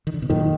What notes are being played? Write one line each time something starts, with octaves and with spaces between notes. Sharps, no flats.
D#3
D3
B2
F#2 A#2 D#3